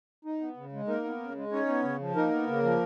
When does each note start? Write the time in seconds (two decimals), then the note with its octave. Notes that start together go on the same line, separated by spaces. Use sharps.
0.25 D#4
0.41 B3
0.57 C#3
0.72 G#3
0.87 A#3 D#4 A#4
1.04 B3
1.20 C#3
1.36 G#3
1.52 C#4 D#4 C#5
1.68 B3
1.83 C#3
2.00 F3
2.16 A#3 D#4 A#4
2.31 B3
2.47 C#3
2.63 F3